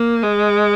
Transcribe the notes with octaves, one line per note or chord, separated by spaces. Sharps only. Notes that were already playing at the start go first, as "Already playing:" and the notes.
Already playing: A#3
G#3